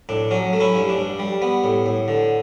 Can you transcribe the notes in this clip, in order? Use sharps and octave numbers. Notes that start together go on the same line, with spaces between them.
A2 D4
F#3 C#4
A3
C#4 E4
G2
D4
G2
G3
B3
A2
A2
D3